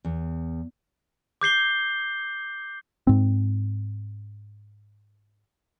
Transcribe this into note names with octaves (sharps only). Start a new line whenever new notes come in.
E2
D6 G6 C7 G7
G#2 C4